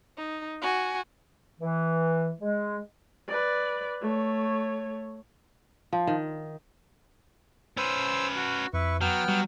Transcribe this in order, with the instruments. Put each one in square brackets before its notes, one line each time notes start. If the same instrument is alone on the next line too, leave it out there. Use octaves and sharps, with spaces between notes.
[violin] D#4
F#4 G#5
[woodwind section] E3
G#3
[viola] B4 D5
A3 C#5
[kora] F3
D#3
[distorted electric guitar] C#4 B4 [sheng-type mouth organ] C5 E6
[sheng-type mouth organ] F#4
[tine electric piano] F2 [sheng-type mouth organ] E4 B4 C#6
[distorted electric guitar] F#3 [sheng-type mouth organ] B3 G5 F6
[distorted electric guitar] F#3 [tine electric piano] G3